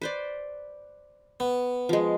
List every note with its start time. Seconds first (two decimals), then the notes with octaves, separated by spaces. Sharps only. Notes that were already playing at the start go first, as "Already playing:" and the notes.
0.01 B4 C5 D5
1.40 B3
1.89 F3 G#3